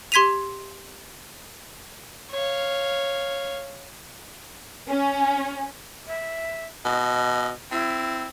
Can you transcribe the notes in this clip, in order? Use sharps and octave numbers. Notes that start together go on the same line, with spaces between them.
G4 C6 G#6 B6 D#7 F7
C#5 F5
C#4
E5
B2 D#5
C4 E4